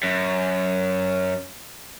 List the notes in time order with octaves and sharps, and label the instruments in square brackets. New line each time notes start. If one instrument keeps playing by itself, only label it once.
[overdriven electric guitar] F#2